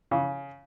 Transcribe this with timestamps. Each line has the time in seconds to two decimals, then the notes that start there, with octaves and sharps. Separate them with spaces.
0.11 C#3